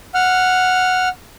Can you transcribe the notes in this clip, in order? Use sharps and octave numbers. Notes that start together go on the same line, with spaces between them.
F#5 F6